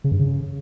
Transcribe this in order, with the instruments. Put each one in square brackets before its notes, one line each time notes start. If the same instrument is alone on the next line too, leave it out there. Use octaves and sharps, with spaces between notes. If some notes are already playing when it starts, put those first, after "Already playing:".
[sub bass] C#3
G2
C#3